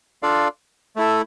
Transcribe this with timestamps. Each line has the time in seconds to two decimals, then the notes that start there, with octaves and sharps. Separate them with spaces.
0.22 D4 F4 A4 D5 F5
0.96 A3 E4 A4